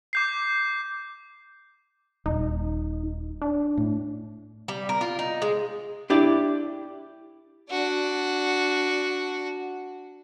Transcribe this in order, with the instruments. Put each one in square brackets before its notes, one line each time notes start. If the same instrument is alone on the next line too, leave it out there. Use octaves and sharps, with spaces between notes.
[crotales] D6 G6 C7
[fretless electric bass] D#1 [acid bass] D#4
[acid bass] D4
[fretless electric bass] A2
[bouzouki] G3
A#4
F4
D#4
G#3
[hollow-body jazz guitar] D4 E4 G4 D5
[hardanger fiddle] D4 F#4